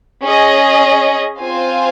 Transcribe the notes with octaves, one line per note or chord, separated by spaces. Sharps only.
C#4 G#4 D#5
C4 F4 C5 F5 G#5